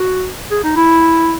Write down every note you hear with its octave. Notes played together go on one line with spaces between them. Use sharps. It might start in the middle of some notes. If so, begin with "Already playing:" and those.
Already playing: F#4
G#4
D#4
E4